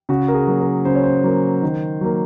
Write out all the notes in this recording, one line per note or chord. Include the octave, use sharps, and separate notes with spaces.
C#3 F#4
A#4
G#4
F#3 A#3
A#4
C#3 C5
C#5
C5
F#3 A#3
D#3
F#3 A#3